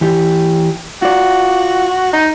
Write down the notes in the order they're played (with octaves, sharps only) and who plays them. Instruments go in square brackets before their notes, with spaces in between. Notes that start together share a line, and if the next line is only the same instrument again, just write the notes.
[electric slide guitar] E3 G4
[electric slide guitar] F4 D5 [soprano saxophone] F#4
[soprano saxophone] D#4